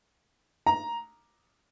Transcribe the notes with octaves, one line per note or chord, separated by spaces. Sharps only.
A#5